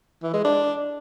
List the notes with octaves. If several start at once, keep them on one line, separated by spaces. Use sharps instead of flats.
E3
G#3
D4